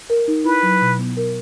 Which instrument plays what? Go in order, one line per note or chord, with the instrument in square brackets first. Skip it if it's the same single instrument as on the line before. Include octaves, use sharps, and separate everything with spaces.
[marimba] A#4
D#4
[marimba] E4 [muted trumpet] B4
[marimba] F#3
B2
B3
A#4